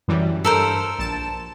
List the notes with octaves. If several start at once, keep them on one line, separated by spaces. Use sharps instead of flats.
F#2 E3 G3
G2 A4 A#4 C5
A#1 A5 E7